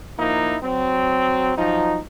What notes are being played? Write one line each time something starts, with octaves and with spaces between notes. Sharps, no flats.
F3 A#3 D#4 E4
F#3 C4
F3 F#3 D#4